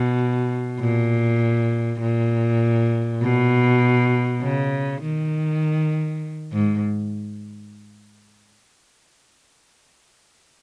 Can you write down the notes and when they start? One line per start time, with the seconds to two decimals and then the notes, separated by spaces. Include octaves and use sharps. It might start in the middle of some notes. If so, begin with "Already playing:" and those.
Already playing: B2
0.80 A#2
2.00 A#2
3.21 B2
4.42 C#3
5.01 D#3
6.52 G#2